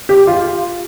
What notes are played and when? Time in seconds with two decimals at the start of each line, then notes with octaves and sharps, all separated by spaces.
0.09 G4
0.27 F4